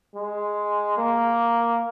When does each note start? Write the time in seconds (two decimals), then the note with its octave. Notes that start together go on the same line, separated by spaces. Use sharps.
0.15 G#3
0.98 A#3